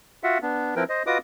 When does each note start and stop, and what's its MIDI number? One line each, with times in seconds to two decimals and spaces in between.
0.24 0.38 65
0.24 0.38 66
0.24 0.38 76
0.24 0.38 78
0.42 0.75 59
0.42 0.75 62
0.76 0.84 53
0.76 0.84 60
0.76 0.84 64
0.76 0.84 70
0.76 0.84 71
0.76 0.84 79
0.89 1.03 72
0.89 1.03 75
1.07 1.18 65
1.07 1.18 66
1.07 1.18 71
1.07 1.18 75
1.07 1.18 86
1.07 1.18 87